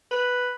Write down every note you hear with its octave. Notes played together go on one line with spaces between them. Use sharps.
B4